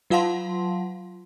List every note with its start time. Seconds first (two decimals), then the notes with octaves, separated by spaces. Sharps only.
0.10 F#3 F4 F5 F#5 A5 C6